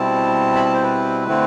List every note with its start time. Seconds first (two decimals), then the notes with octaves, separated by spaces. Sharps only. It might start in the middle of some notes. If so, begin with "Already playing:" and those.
Already playing: B2 G3 C4 E4 A5
0.55 B5
0.65 A5
0.74 C5
0.83 B4
1.28 D3 A3 C4 E4